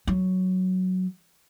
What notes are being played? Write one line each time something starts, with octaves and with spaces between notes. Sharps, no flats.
F#3